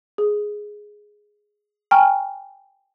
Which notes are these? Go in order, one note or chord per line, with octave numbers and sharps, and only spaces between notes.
G#4
G5 G#5 A#5 C#6 F6